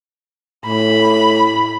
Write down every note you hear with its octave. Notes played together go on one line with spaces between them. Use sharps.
A2 B5